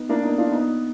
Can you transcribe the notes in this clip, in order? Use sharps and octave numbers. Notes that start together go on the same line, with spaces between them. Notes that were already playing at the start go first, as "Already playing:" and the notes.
Already playing: B3 D#4
A#3 D4
B3 D#4
D4 F4
B3 D#4